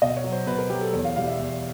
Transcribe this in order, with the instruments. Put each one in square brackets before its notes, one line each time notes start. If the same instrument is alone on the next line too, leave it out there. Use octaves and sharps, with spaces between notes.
[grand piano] B2 D#5
C#5
F#3
C5
B2 B4
A#4
F#3 G4
A4
E2 C#5
F5
B2 G3 F5
E5
E2